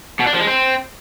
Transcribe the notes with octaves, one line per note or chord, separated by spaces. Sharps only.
B2
D4
F3
G#3
C4